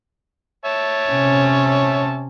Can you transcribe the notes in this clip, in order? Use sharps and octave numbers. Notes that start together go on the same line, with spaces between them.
C#5 E5 A5
C3 C#4